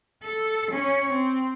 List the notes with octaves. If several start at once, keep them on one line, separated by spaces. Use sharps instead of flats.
A4
C#4 C#5
C4